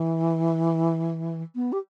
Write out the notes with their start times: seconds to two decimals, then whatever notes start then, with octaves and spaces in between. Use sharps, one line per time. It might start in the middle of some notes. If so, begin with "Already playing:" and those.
Already playing: E3
1.55 B3
1.72 G4